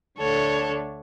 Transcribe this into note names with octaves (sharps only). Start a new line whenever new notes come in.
D2 D3 A3 D4 A4 C#5